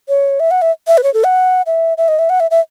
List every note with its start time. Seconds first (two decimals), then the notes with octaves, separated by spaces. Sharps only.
0.09 C#5
0.40 E5
0.51 F#5
0.62 E5
0.87 E5
0.98 B4
1.03 C#5
1.14 A4
1.24 F#5
1.66 E5
1.98 E5
2.08 D#5
2.19 E5
2.30 F#5
2.40 E5
2.51 E5